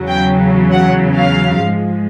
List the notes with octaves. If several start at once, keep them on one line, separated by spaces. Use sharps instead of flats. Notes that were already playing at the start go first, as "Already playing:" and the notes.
Already playing: E2 C#3 F#3
G5
F#5
F5
G#2 F3 G#3